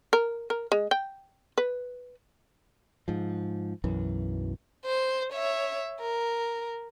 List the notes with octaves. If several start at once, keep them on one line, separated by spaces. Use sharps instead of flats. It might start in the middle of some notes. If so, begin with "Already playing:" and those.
A#4
A#4
G#3
G5
B4
G#2 F3
B1 F#2 E3
C5
C#5 E5
A#4